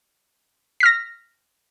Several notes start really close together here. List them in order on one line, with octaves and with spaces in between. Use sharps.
B6 F6 A#6